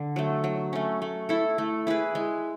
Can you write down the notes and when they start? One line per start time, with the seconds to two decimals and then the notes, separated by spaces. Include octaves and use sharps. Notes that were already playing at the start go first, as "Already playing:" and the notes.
Already playing: D3
0.16 F#3 A3
0.44 F#3
0.73 A3 C#4
1.02 A3
1.29 E4 A4
1.58 A3
1.87 E4 G#4 B4
2.15 G#3